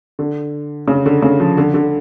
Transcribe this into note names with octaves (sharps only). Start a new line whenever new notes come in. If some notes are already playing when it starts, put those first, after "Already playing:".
D3
C#3
D3
C#3
F3
D3
D3